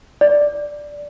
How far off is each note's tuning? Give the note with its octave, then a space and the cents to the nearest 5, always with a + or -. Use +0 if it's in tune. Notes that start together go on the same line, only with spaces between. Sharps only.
D5 +0